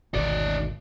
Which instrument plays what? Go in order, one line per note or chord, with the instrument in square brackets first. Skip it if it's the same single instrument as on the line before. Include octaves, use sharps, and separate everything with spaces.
[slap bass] G#1 D2 B2 [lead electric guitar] D#4 D5